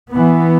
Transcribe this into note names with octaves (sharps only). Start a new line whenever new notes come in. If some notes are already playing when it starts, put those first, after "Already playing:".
E3 B3